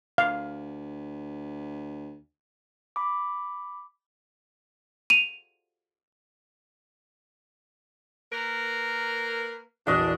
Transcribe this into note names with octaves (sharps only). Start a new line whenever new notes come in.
D2 F5
B5 D6
D#7 F7
A#3 A#4 B4
A#1 E2 D4 F#4 D#5 F#5